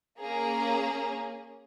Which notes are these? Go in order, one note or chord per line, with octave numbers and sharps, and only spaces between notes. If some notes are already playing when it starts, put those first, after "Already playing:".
A#3 C#4 G#4 A#5